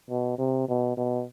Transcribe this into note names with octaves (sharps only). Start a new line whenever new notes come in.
B2
C3
B2
B2